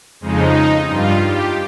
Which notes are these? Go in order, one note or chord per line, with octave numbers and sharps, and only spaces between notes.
F2 C#3 F3 G#3 D#4
G2 G3 F4
G4